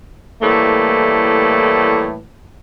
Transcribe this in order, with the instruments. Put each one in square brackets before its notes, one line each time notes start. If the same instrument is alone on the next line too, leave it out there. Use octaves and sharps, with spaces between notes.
[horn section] A2 E3 G3 A3 A#3